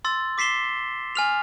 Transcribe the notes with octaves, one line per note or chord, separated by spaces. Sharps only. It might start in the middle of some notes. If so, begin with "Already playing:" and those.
C6 E6 A6
D6 B6 C7 E7 G7
G#5 F6 F7